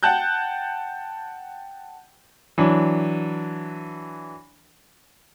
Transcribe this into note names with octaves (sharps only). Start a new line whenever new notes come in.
F#5 G5 A5 F#6 G6
E3 F#3 D4